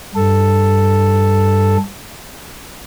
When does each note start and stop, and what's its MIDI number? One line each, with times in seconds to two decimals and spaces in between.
0.15 1.77 43
0.15 1.77 69